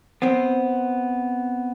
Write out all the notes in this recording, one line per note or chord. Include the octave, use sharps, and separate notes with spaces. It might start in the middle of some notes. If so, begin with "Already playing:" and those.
B3 C4